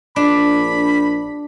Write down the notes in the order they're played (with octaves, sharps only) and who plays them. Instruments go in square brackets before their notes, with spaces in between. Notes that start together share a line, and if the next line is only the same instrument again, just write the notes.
[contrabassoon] A#1 [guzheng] D4 [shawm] B5